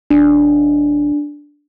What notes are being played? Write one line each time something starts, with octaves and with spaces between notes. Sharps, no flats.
D#1 D4